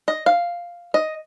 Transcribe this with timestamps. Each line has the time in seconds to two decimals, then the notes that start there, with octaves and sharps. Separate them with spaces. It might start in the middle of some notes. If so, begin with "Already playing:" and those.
0.08 D#5
0.26 F5
0.94 D#5